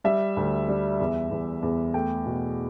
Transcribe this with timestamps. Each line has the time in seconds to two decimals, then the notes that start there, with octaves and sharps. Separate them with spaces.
0.04 G3 E5
0.37 D2
0.68 G3
1.00 E2
1.31 E2
1.62 E2
1.94 A3 G5
2.26 B2